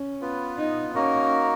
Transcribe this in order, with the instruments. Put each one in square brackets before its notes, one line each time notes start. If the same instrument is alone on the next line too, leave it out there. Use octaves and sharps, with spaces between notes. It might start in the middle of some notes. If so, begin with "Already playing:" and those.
Already playing: [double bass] C#4
[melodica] B3 F4 B4
[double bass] D#4
[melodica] A#3 D#4 F#4 A#4 [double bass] C#4